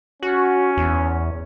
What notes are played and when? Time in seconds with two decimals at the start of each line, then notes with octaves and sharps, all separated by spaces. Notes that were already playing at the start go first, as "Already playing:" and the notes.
0.23 C#4 F#4
0.77 E2